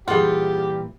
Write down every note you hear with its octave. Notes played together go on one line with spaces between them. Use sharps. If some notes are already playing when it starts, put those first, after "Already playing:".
A#2 E3 G3 F4 G4 G#4 F#5